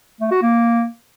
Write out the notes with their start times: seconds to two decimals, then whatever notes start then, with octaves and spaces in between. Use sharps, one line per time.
0.20 A3
0.31 F#4
0.42 A#3